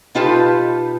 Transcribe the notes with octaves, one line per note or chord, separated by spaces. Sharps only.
B2 D#4 F4 G4 B4 A5